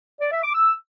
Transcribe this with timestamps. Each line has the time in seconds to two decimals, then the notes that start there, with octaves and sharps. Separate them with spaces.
0.20 D5
0.31 E5
0.43 D6
0.54 E6